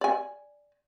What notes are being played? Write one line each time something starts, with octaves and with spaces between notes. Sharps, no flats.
D5 G#5